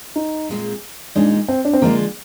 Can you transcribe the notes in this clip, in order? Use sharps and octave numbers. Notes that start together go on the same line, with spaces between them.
D#4
A#2 G#3 C4
A#2 G#3 D4 D#4
C4
D4
C4
D3 F3 G#3 A#3 D4 F4